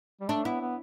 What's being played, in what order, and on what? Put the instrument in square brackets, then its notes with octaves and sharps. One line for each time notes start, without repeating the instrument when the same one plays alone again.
[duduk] G3
[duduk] A3 [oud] D4
[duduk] B3 [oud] E4
[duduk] B3